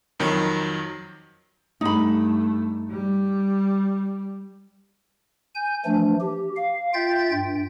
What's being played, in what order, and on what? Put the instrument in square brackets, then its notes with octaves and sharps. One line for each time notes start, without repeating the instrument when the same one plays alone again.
[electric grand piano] F2 D#3 F#3
[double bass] G2 A3 [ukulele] D#4 B5
[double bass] G3
[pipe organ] G#5 G6
E3 F3 A3 D4
G4
F5
F4 E5 G5 G6 A6
G2 G5